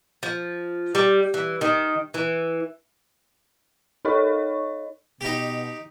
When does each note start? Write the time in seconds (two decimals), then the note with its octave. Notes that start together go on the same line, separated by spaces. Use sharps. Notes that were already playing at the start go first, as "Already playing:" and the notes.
0.23 F3
0.95 G3
1.34 E3
1.61 D#3
2.14 E3
4.05 D#4 A4 A#4 C#5 D#5 C#6
5.21 B2 D#4 G4